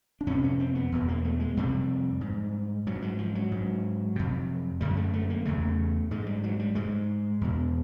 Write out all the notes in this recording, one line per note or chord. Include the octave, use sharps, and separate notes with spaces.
D4
F2 C3 C#4
C#4
C4
B3
E2 B2
A#3
A3
G#3
F2 C3 G3
G#2
G#2 F#3
F#3
F3
F#3
G#2
F2 C3
F#2 D3 G3
A3
A3
A#3
E2 C#3 A3
G#2 G#3
G3
F#3
G3
G#2 G#3
E2 B2